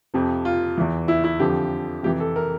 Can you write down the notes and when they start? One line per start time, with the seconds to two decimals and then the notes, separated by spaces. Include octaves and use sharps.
0.14 F2 C3 F3
0.45 F4
0.78 E2 E3
1.08 E4
1.24 E4
1.40 F2 D3 F3 G4
2.03 F2 C3 E3 G4
2.20 A4
2.36 A#4